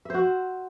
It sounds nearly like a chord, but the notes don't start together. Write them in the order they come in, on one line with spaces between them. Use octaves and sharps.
E5 C5 F#4